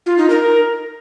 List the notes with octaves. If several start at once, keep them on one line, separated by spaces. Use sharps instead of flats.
F4
D#4
A#4